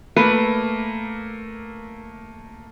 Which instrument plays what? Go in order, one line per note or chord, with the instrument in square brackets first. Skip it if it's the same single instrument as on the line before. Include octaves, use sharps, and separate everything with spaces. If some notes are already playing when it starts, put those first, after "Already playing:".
[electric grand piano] A3 A#3 [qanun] B4